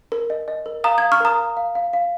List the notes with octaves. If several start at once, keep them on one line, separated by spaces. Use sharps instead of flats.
A#4
D#5
D#5
A#4
F5 A#5 D#6
F5 D#6 G#6
C#6 F6
A#4 A#5 D#6
F5
F5
F5
F5